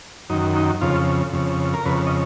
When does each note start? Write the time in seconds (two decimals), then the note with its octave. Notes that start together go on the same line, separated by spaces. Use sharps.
0.30 F#2 D#3 D#4
0.56 D#4
0.81 F2 C#3 F4
1.33 F2 C#3
1.74 A#4
1.85 F2 C#3 B4
2.07 D#5